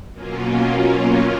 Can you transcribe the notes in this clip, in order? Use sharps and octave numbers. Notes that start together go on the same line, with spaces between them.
B2 F#3 A#3 C#4 F4